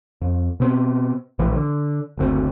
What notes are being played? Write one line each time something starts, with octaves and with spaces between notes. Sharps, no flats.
F2
B2 C4
A#1 A2 E3 F3
D3
F#1 D2 C4